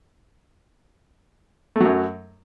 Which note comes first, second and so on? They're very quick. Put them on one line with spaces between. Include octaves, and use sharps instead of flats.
A3 F#3 F#2